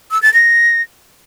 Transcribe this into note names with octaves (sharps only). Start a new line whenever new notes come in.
E6
A6
A#6